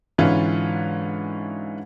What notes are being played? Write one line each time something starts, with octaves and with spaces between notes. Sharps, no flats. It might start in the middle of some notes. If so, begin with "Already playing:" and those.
G#2 D3 E3 C#4 F4